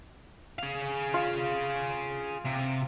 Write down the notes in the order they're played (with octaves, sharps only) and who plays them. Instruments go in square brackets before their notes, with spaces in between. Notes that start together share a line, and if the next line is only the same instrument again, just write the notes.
[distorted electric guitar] G#4 F5
[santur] F4
[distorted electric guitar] C3